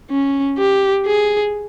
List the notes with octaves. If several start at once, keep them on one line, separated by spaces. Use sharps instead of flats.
C#4
G4
G#4